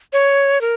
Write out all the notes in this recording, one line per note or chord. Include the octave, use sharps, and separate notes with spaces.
C#5
A#4